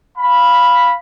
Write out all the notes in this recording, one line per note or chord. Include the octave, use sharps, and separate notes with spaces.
F5 B5